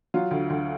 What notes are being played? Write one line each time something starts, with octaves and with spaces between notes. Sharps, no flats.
F#3 F4
D2
D2